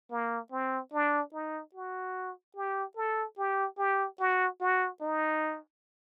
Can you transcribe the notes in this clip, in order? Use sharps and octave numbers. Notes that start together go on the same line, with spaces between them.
A#3
C4
D4
D#4
F#4
G4
A4
G4
G4
F#4
F#4
D#4